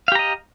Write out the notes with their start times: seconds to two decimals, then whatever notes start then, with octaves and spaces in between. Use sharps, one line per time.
0.08 F5
0.12 G4
0.15 A#5
0.19 D#5